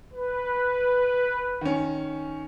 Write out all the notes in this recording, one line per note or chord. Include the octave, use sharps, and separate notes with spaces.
B4
D#3 C#4